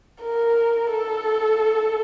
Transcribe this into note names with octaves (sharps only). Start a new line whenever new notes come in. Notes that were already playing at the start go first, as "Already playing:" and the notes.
A#4
A4